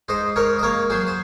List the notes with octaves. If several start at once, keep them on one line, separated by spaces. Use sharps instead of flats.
G#2 C5 D#5
G#2 A#4 C#5
D#5
A#3 A#4 C#5
F#3 G#4 C5
C5